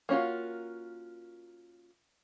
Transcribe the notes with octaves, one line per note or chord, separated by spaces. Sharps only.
A#3 C#4 D4 F4 F#4